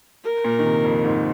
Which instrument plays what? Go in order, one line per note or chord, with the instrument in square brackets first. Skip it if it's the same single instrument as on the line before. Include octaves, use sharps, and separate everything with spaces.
[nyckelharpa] A#4
[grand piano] A#2
D#3
C3
F2
G#2